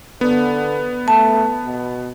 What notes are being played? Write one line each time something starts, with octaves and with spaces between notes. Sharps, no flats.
D3 B3
A3 A5
B2